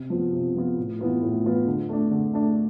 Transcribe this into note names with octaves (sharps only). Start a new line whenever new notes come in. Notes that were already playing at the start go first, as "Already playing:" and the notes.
Already playing: C3
F3 B3 F4
C3
F3 B3 F4
A2
E3 B3 F4 B4
A2
E3 B3 F4 B4
D3
A3 D4
D3
A3 D4